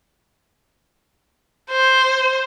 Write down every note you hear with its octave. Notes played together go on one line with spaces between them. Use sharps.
C5